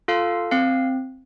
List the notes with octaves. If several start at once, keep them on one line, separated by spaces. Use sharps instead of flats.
F4 A4 F5
C4 F5